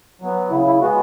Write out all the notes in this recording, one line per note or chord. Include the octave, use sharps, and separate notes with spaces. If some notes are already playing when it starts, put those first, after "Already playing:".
F#3 B3
C#3 E4
E4
G#3 B3 F#4